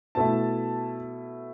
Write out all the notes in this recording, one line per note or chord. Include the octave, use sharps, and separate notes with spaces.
B2 A3 E4 A5